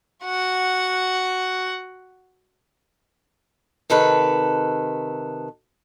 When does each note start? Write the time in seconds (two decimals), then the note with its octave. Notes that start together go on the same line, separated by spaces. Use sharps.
0.25 F#4 F#5
3.90 C3 D#3 A4 B4